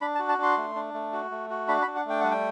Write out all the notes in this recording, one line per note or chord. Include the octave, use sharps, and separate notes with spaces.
D4 B5
A5
F#4
A5
D4 C6
A3
D4
A3
F#4
A3
F#4
D4 B5
B5
D4
F#5
A3 G5
G3 F#5
G5